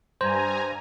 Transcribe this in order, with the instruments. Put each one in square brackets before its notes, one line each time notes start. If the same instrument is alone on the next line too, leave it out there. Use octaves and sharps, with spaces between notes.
[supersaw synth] G2 G#5 A#5 [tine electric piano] C5